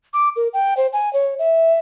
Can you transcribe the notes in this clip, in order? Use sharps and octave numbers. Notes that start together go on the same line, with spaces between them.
D6
A#4
G5
C5
G#5
C#5
E5